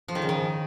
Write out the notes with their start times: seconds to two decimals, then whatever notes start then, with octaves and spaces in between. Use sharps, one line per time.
0.08 F3
0.15 D#3
0.22 C#3
0.29 D#3